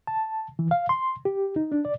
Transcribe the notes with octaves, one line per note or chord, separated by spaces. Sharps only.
A5
E3
F5
C6
G4
D#4
D4
D5